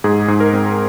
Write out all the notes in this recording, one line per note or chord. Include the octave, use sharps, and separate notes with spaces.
G#2 G#4
G#2
A#4
C4